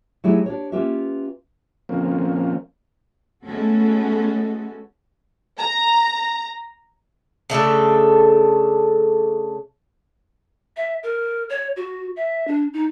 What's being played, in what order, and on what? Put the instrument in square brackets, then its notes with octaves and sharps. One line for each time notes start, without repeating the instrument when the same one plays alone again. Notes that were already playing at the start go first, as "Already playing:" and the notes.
[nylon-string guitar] F#3 A3 D#4 E4 G4 G#4
D4 G4 C#5
A#3 C#4 F4 G4 B4 E5
[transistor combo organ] F3 A#3 C4 C#4
[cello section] G#3 A3 B3 C#4 F#4 A4
[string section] A#5
[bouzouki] C#3 A3 D4 A4
[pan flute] E5
A#4
C#5
F#4
E5
D4
D#4